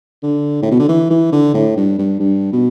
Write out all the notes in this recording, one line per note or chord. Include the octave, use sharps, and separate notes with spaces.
D3
A2
B2
D3
E3
E3
D3
A2
G2
G2
G2
B2